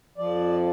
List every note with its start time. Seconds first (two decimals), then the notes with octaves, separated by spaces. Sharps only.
0.18 F2 F3 D5